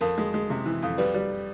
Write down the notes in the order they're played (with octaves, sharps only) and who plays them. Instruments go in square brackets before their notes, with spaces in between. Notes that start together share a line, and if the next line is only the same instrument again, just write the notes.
[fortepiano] F2 [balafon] A#4
[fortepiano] G#3
G#3
C3
E3
F2
[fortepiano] G3 [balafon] B4
[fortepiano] G3